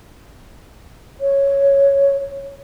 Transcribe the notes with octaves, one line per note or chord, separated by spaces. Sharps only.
C#5